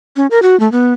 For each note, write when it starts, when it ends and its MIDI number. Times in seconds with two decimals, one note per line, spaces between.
0.16 0.27 61
0.31 0.42 70
0.42 0.58 66
0.60 0.70 57
0.72 0.93 59